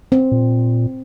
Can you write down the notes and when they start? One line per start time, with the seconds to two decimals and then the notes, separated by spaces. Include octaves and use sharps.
0.12 C4
0.32 A#2